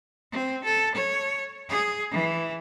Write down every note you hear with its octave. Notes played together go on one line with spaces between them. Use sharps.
C4
A4
C#5
G#4
E3